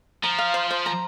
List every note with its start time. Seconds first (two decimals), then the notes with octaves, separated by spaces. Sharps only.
0.23 F3 A#5
0.39 F5
0.54 C5
0.71 C5
0.86 A#5